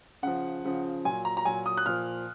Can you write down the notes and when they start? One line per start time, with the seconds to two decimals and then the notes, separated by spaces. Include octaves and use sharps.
0.23 C#3 F3 F#5
0.64 C#3 F3
1.05 A#2 F#3 G#5
1.25 A#5
1.37 A#5
1.45 A#2 F#3 G#5
1.66 D#6
1.77 F#6
1.86 A#2 F3 F6